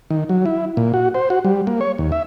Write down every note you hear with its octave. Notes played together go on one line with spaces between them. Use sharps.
D#3
F#3
E4
A#2
F#4
C5
F#4
G3
A#3
C#5
D#2
E5